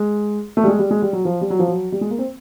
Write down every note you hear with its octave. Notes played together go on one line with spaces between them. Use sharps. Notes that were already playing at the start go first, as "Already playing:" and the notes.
Already playing: G#3
A3
G3
G#3
G3
G#3
G3
F#3
F3
G3
F#3
F3
F#3
G3
G#3
A#3
C4